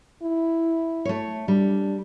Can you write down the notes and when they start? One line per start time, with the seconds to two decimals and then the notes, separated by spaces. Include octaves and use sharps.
0.23 E4
1.05 A3 C#5
1.48 G3 D4